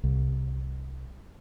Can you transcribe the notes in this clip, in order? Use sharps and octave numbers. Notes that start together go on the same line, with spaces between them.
C2